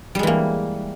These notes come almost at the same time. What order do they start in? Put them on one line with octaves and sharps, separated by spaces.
G3 G#3 E3 A#3